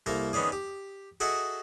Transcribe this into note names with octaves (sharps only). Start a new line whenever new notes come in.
C2 A#3 A4 A#4
D#3 B3 C#4 D4 G#4
G4
F#4 G#4 A4 D#5 E5 F#5